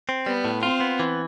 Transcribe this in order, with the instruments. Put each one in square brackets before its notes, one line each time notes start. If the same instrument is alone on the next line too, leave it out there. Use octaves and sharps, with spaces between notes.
[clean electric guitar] C4
[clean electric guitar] G3 [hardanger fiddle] B3
[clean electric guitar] A2
[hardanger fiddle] C4 [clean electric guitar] F4
[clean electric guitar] B3
E3